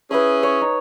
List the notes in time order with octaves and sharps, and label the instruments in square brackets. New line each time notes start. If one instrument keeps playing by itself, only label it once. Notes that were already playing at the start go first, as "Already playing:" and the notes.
[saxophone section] C#4 E4 G#4 [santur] B4 D#6
[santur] C#5
D#4